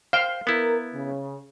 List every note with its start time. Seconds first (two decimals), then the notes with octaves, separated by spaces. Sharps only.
0.13 C5 F5 G5
0.47 B3 E4 A#4
0.94 C#3